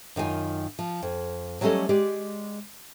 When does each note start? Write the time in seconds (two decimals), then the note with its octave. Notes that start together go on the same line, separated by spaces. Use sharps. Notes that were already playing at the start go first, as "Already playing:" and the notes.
0.16 F#2 D#3 F4 G#5
0.79 F3
1.02 F2
1.61 F#3 G3 A3 C#4 A4 D#5
1.89 G#3 G4 D5